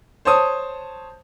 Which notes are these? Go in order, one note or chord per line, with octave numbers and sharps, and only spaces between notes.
C5 C#5 A5 D#6